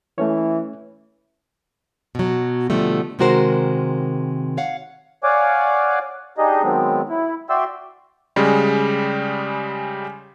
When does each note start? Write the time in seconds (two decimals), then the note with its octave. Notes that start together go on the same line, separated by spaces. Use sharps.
0.18 E3 A3 C#4 C#5
2.15 B2 F#3
2.70 B2 D3 F3 G3 A3
3.19 C3 D#3 G#3 F#4 A#4 C5
4.57 C#5 F5 F#5
5.24 C#5 D5 F5 F#5 G#5 D6
6.38 D4 D#4 G4 G#4 D#5
6.63 D#3 F#3 G#3 B3 C4
7.09 E4
7.50 F#4 D5 E5 G5 C6 E6
8.36 C#3 G3 G#3